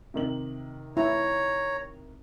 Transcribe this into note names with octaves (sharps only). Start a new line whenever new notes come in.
C3 D#3 F#7
E4 C#5 A#5